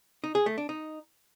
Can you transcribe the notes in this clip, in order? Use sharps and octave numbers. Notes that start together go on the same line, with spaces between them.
D#4
G#4
A3
D4
D#4